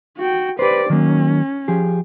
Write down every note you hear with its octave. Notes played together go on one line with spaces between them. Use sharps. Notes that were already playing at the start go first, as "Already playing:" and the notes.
F#4 G5
G4 B4 C5 D5
D#3 F#3 A#3 C#4
F3 G4 G#4